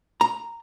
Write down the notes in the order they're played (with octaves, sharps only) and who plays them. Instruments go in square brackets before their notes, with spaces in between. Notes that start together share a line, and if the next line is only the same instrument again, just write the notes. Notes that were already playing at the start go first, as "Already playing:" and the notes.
[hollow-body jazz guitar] A#5